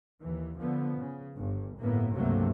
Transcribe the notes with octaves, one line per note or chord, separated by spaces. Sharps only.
D#2 E3
D3 F3 B3
C#3
G1 G2
G1 A2 A#3 B3
C#2 G2 C3 F#3 A3 A#3